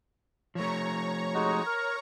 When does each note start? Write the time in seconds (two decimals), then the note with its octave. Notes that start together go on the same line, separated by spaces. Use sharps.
0.55 F3 A3 C#5 A#5 C#6
1.34 G#3 D#4 F#4
1.66 A#4